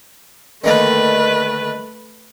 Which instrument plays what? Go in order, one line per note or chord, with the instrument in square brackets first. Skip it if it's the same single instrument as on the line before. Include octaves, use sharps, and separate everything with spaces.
[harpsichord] D3 D#3 A#3 [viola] A3 B4